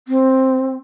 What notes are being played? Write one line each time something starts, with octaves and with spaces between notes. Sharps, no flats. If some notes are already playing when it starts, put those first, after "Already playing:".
C4